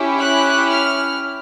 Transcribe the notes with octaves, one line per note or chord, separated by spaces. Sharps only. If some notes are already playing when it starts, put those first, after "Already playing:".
Already playing: C#4 E4 G4
F#6
F6